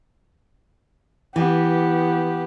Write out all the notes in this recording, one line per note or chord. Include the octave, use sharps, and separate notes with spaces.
E3 B3 G4